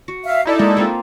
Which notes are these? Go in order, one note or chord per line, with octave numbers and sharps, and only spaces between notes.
F#4
E5 F5
D#4 E4 A4 D5
G#3 A#3
A#3 C4 F4